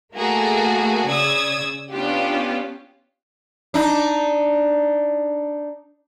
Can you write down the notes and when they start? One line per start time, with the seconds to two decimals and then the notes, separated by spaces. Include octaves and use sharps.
0.15 A3 A#3 F#4 G#4 A4
1.06 C#3 D5 D#6 E6 G#6
1.93 B3 C#4 D4 F4 G4
3.74 D4 D#4